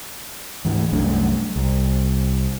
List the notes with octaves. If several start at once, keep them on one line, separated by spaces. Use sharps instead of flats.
D2 G#2 E3
C2 F#2 A3 D4
C2